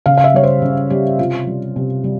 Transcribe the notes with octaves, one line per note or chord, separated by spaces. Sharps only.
C#3 F5
F5
E5
G3 C#5
C5
C#3
G3 G4
C3 F4
G3
C3
G3